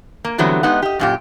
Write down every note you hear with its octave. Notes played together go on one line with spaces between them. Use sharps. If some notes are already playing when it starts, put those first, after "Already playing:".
A#3
D3 E3 F#3 G3 B3 C4
G#3 B3 D#4 G4 F#5
G4 D#5
F#2 A#2 G4